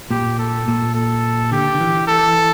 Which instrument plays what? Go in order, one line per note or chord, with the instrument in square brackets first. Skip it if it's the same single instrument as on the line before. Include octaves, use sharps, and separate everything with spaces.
[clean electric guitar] A#2 [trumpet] G4
[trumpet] A4
[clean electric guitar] A#2
[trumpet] A4
[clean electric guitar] D3 [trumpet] G4
[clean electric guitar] D3
E3
[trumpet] A4